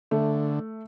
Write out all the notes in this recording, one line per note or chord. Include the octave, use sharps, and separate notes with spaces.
D3 A3